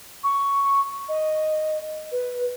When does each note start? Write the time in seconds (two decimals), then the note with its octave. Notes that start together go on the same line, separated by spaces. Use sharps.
0.24 C#6
1.09 D#5
2.12 B4